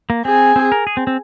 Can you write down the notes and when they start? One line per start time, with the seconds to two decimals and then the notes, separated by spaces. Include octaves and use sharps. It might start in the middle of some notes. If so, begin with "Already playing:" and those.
0.10 A#3
0.25 C4 G#4
0.56 C4
0.72 A#4
0.87 G#4
0.97 C4
1.07 C4